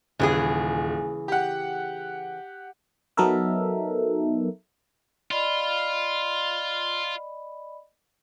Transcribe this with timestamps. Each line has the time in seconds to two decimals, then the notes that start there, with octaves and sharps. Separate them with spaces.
0.20 D#1 C#3 E3 G#4
1.28 G4 F#5
3.17 F#3 B3 D#4 A4 A#4 E5
5.31 F4 D5 D#5 B5